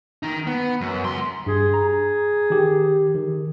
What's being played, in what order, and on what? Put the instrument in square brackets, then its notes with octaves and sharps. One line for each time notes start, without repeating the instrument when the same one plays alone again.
[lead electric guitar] D#3 D#4
B3
F#2
C#2 C6
[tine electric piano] G2 [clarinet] G#4
[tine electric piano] A#5
D#3 G4
D#3